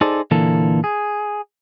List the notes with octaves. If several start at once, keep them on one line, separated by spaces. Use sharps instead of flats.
D#4 G#4 A4 C5 D5
A#2 D3 E3 A#3 A4
G#4